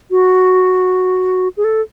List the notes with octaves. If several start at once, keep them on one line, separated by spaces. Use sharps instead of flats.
F#4
G#4
A4